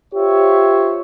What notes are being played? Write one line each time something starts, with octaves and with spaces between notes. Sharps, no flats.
F4 G4 C5 C#5 E5